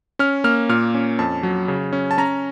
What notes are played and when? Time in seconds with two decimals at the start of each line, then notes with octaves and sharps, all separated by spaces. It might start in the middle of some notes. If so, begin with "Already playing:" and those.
0.19 C#4 F6
0.44 A#3 F6
0.69 A#2 F6
0.95 C#4
1.19 F2 A5
1.43 F#3
1.68 C#3
1.93 C#4
2.11 A5
2.18 C#4 A#5